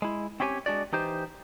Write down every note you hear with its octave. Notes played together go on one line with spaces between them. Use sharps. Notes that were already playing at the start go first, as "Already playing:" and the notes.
G#3 E4
C4 C#4 E4 G4 C#5 G#5
G#3 D4 F#4 D5
E3 D#4 G4 C5